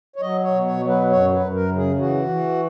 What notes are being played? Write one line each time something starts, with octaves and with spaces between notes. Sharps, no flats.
C#5
F#3 D#5
C#5
B2
C#5
F#3
B4
F#2 C#5
B4
F#2
A#4
C#3
G#4
E3 F#4
E3